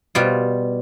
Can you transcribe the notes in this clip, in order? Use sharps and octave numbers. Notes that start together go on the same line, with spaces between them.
B2 G3 F4